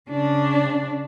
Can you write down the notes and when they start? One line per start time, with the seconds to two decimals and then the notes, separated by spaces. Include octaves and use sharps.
0.10 C#3 D4